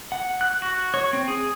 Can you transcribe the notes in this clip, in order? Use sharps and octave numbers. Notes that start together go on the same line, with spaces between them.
F#5
F#6
F#4
C#5
C4
G#4